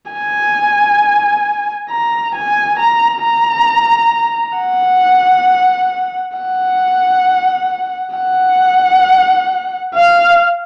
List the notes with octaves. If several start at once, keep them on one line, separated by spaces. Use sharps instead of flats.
G#5
A#5
G#5
A#5
A#5
F#5
F#5
F#5
F5